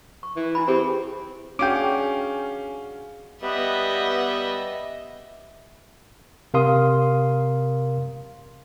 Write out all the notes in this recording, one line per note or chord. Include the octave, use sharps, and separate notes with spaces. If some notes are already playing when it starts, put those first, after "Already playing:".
C#6
E3
E4 G#5 B5
C4 G4 G#4
C#4 D4 F#4 G#4 F5 G5 D6
G3 B3 D#5 E5
C3 A#4 F5 C6 D#6